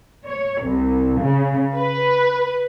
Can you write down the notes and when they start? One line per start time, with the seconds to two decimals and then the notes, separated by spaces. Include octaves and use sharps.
0.25 C#5
0.63 C2
1.20 C#3
1.76 B4